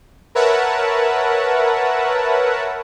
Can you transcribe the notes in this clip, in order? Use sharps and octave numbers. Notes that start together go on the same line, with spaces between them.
A#4 B4 C#5 E5 F#5 A5